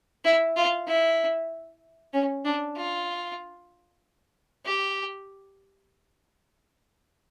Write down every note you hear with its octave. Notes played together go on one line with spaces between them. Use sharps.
E4
F4
E4
C#4
D4
F4
G4